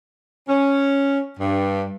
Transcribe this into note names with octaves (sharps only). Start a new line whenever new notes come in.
C#4
G2